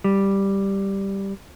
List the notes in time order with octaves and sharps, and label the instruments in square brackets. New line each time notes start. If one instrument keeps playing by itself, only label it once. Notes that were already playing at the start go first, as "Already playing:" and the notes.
[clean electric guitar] G3